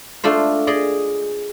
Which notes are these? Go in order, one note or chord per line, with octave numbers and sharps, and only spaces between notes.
A3 D4 F4 C5
G#4 D5 D#5